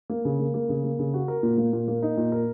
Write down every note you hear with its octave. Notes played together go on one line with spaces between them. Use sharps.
A#3
C#3
A#3
A#3
C#3
A#3
C#3
F#4
A#4
A#2
A#3
A#2
A#3
D#4
A#2
A#4